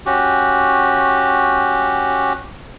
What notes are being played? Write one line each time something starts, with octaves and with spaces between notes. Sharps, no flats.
C#4 F#4 G4